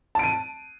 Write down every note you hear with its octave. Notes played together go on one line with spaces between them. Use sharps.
A5 D7 D#7